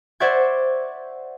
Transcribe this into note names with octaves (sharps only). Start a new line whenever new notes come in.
C5 D5 E5 F#5 C#6 G#6